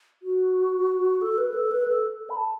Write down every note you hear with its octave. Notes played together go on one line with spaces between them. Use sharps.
F#4
A4
B4
A4
B4
A4
A4
B5
A5